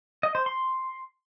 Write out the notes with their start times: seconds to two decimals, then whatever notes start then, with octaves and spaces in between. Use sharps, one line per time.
0.23 D#5
0.35 C5
0.46 C6